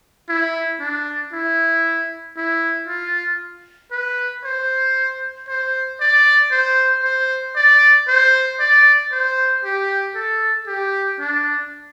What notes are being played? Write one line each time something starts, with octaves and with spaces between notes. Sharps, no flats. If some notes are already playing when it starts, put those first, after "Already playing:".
E4
D4
E4
E4
F4
B4
C5
C5
D5
C5
C5
D5
C5
D5
C5
G4
A4
G4
D4